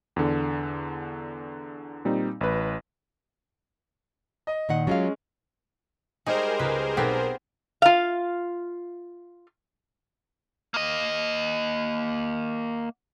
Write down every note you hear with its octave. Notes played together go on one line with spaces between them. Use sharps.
E2 D3
A#2 G3 C4 D#4
A1 B4
D#5
A#2 D#3 F#5
F#3 G#3 C#4 F4 F5
G3 G#3 D#4 G#4 A#4 C5
C#2 B4
B1 B3 C4 G4 A4 G#6
F4 F5
A#3 D#5